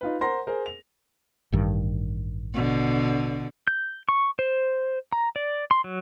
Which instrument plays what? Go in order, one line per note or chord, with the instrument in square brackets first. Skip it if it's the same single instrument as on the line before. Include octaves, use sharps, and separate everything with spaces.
[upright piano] D#4 F4 B4
A#4 C5 F#5 A#5 C6 A#6
G#4 A#4 C5
F7
[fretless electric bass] A1 G2 D#3
[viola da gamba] B2 D3
[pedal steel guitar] G6
C#6
C5
A#5
D5
C6
F#3